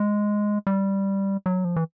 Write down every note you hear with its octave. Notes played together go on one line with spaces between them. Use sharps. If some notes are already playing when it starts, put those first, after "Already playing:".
Already playing: G#3
G3
F#3
F3
E3